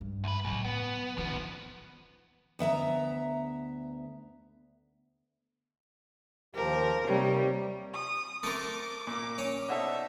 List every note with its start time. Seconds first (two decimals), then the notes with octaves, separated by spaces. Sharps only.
0.01 G2
0.24 D2 B4
0.45 C#2 A2 F#3
0.65 B3
1.18 D3 D#3 F3 B3
2.59 D2 B3 E5 A#5
6.55 D#2 F3 G4 A#4
7.07 C3 G3 A#3 D#4 C#5
7.93 D#6
8.43 A3 C4 A4 A#4 D6
9.07 A#2 A#3 D6
9.38 C#4
9.69 B2 D#4 A4 C5 D5 E5 F#5